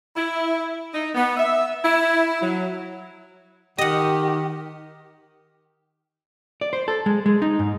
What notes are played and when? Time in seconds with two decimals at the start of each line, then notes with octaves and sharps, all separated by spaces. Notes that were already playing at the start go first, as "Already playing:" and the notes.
0.16 E4
0.93 D#4
1.14 B3
1.37 E5
1.83 E4
2.41 F#3
3.78 D#3 G4 D#5 F#5
6.61 D5
6.73 C5
6.88 A4
7.06 G#3
7.26 G#3
7.42 D#4
7.59 G#2